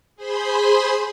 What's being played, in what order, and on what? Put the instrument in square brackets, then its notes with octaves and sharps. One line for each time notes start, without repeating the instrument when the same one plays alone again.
[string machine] G#4 C5 B5 C6